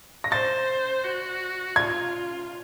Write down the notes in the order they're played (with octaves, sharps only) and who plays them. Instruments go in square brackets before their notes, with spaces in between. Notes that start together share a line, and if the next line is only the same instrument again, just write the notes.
[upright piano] A#6
[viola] C5 [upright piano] A6
[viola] F#4
[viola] F4 [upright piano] G#6